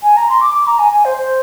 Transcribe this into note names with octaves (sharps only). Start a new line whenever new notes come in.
G#5
A#5
C6
D6
D6
A#5
G#5
G#5
C5
C5